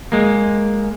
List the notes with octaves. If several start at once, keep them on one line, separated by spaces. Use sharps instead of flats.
G#3 A#3